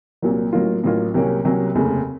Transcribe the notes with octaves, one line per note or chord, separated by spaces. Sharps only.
C2 A#2 F#3 A#3
A1 A2 F#3 A#3 F4
A1 A2 F#3 A#3 F4
C2 C3 F#3 A#3 C#4
C2 C3 F#3 A#3 C#4
F1 D#2 C#3 A3